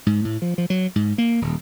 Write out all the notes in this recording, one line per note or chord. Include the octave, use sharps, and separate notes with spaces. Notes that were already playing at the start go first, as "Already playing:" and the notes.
G#2
A2
F3
F3
F#3
G#2
A#3
D#1